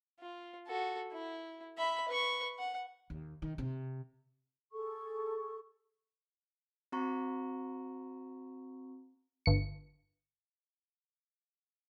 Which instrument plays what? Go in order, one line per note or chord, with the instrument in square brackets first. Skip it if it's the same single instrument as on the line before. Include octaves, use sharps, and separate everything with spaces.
[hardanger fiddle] F4
F#4 A4
E4
E5 B5
B4 C#6
F#5
[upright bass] D#2
D#3
C3
[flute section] G#4 A4 C#6
[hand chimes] C4 F#4 A#5 C#6
[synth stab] G1 C#7